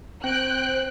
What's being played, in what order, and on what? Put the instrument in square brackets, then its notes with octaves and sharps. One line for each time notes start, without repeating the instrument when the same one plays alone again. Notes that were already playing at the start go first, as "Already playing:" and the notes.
[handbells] C4 D7 [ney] C5 [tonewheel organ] G5 [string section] F#6